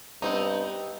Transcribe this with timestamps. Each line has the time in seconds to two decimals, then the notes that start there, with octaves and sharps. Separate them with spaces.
0.22 G2 G3 B3 C4 D#4 D#5 A#5